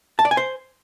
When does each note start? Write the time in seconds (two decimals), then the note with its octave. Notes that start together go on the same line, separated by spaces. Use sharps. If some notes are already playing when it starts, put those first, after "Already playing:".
0.19 A5
0.25 D5
0.31 G#5
0.37 C5